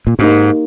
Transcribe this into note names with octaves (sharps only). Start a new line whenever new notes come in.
A#2
G#2 A#3 D#4 G4